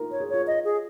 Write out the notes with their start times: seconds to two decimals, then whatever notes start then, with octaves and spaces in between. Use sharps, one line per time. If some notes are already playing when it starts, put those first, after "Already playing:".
Already playing: D#4 F4 A#4
0.11 C#5
0.20 G#4
0.29 F4 C#5
0.47 D#5
0.65 G#4